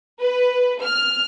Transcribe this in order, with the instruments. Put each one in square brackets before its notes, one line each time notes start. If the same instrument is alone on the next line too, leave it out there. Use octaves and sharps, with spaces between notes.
[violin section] B4
F6